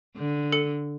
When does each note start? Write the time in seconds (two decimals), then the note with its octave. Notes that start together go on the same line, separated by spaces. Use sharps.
0.17 D3
0.52 A4 C#7